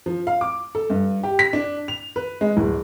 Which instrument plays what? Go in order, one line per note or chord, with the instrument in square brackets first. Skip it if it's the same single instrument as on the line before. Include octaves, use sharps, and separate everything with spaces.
[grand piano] F3
F5
D6
A4
G2
G4
B6
D4
F7
B4
G#3
D1